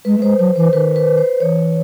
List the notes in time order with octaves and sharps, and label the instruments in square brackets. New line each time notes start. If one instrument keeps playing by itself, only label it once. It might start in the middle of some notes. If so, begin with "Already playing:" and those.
[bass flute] G#3 [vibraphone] B4
[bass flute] A3
[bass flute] G#3 [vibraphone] C5
[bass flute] F#3 [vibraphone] C5
[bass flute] E3 [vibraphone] C5
[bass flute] D#3 [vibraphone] B4
[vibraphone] B4
C5
[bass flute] E3 [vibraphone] C#5